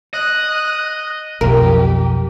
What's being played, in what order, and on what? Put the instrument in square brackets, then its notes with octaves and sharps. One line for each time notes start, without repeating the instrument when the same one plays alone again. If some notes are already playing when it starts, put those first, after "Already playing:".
[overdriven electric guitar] D#5 [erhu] F#6
[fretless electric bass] B1 F2 [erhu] G4 [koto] A#4